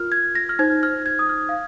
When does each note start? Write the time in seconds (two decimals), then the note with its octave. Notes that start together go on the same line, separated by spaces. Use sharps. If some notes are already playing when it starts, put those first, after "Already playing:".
Already playing: F4 A#4 F6
0.12 G#6
0.35 A#6
0.49 F6
0.59 D#4 C5 G#6
0.83 F6
1.06 G#6
1.19 D#6
1.29 F6
1.49 F5